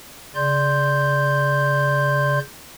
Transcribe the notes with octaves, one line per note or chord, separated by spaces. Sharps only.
C#3 D5 C6 G6